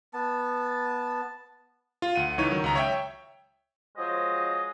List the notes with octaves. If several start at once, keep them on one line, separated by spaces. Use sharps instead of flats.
B3 A5
F4
D2 F#5 D#7
C#2 E3 D#4 C#5 D#7
D#3 F#3
C#2 A#5
C#5 E5 G5
F3 F#3 G#3 C5 D#5